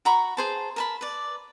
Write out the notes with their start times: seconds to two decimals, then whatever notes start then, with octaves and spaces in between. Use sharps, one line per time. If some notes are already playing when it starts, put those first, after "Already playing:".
0.05 F#4 A#5 B5 C#6
0.37 G#4 C5 A5
0.76 A#4 A5 B5
1.01 B4 D5